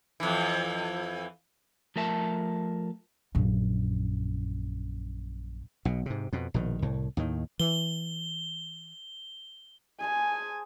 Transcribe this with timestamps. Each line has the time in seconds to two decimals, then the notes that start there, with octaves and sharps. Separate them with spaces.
0.20 F2 E3
1.96 F3 A3 A#4 E5 A5
3.35 A#1 F#2
5.85 B1 B2
6.06 G#2 C3
6.33 F2 B2
6.54 A#1 B2 D#3
6.82 C2 A2
7.17 D#2 A2 D#3
7.60 E3 G7
10.00 G#4 C5 G#5 A5